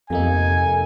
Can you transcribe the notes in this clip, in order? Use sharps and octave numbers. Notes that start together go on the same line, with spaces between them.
F2 C3 A#3 D#4 A4 G#5